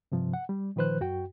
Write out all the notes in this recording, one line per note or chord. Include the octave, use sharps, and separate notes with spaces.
G2 C3 F3
F#5
G3
A#2 D#3 F3 B4 C5 F#6
F#2 F#4 G5